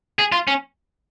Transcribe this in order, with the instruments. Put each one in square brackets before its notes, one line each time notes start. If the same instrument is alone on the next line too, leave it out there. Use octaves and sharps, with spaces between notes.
[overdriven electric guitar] G#4
F4
C#4